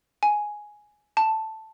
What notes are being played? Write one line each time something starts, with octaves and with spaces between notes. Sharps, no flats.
G#5
A5